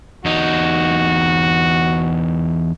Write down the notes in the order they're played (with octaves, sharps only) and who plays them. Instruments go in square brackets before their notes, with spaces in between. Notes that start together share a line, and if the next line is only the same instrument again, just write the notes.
[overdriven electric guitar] E2 D#4 [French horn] F#4